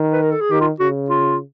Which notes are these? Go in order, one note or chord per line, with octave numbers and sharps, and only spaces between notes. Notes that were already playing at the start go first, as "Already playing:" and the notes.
Already playing: D#3
B4
A#4
A4
G#4
D#3 G4
F4
C#3 F#4
F4